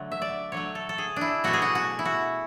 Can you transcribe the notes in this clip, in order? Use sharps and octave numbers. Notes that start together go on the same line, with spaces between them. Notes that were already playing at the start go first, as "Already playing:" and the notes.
Already playing: D3 F#3 A3
E5
D5
D3 F#3 A3 C#5
A4
A4
G#4
D4 E4
B2 F#3 A3 F#4
G#4
F#4
F#4
E4
F#4